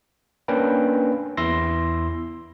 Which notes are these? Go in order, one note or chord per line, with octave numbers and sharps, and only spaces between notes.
A#3 C#4 D4 B4 G5
E2 E4 C6 E6 A#6